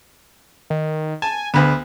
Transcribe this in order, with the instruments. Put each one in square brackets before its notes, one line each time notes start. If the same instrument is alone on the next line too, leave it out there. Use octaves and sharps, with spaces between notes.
[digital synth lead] D#3
[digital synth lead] G#5 [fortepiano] A5
[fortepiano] D2 B3 [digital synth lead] D3